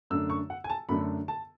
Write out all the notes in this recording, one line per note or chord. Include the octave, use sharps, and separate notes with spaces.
F#2 D3 A3 D4 E6
C#6
F#5
G#5
A5
F#2 D3 A3 D4 B5
A5